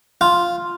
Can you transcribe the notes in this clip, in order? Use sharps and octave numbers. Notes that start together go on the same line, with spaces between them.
F4